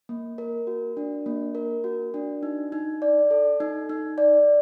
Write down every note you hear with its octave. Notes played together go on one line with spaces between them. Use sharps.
A#3
A#4
F#4
D4
A#3
A#4
F#4
D4
D#4
D#4
D5
A4
D#4
D#4
D5